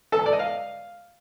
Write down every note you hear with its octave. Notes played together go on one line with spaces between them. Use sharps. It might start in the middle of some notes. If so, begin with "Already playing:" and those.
A4
A5
D5
D#5
F5